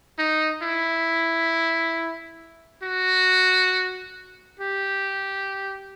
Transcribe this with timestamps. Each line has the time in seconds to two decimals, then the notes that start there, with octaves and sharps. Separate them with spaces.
0.18 D#4
0.62 E4
2.83 F#4
4.59 G4